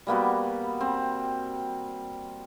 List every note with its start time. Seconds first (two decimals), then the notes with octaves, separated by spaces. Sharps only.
0.07 G3 A#3 B3 F#4
0.81 C4